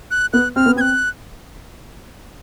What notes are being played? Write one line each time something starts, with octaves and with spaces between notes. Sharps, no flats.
F#6
B3 F#6
C4 F6
B3
C4 F#6 G#6